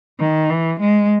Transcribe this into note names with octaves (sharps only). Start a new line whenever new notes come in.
D#3
E3
G#3